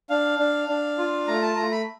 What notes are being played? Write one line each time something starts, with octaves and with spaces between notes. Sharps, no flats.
D4 F5
D4
D4
F4
A3 A#5
A5
A3 A#5
B5